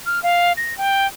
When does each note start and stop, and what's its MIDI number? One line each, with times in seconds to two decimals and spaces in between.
0.06 0.22 89
0.23 0.53 77
0.57 0.76 94
0.78 1.07 79